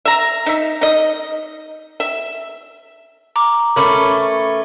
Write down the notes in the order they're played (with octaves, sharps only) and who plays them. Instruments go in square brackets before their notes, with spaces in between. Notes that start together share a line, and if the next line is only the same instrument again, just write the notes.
[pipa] E5 A#5
D#4 E5
D#4 D#5
E5
[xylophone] A#5 D6
[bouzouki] A3 C#4 B4 [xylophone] A#4 B5 D6